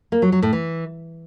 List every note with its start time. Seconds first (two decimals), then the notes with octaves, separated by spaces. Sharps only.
0.12 A#3
0.22 F#3
0.32 F#3
0.42 A2
0.53 E3